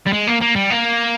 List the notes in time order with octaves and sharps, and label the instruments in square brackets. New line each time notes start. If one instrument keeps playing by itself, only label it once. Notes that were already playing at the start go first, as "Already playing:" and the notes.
[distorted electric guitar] G3
G#3
A#3
A#3
G3
A#3